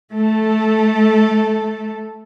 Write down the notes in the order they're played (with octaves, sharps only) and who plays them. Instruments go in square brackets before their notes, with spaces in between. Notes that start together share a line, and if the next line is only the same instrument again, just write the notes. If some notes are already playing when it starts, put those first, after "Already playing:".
[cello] A3 A4